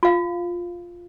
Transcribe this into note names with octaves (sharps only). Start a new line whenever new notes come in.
F4 F5